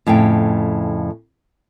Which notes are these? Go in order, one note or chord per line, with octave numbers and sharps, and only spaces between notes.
F2 A2 C#3 G5